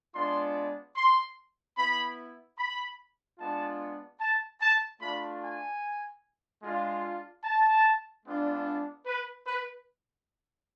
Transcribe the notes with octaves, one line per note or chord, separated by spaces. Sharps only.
G#3 B3 D4 F4 C6
C6
B3 E4 B5
B5
G#3 B3 D4 F4 A5
A5
A5
A3 D4 F4 B5
G#5
G#3 D4 F4
A5
G#3 B3 D4 F4
B4
B4